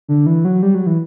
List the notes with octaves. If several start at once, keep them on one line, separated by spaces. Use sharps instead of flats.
D3
E3
F#3
G3
F#3
E3